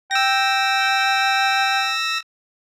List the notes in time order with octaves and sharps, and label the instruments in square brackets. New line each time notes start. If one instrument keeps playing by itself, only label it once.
[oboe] G5 [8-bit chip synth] E6 A#6